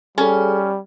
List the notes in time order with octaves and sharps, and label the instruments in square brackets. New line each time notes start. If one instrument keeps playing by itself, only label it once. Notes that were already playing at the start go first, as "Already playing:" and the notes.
[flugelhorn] G3 [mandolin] C#4 [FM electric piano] G#4 A4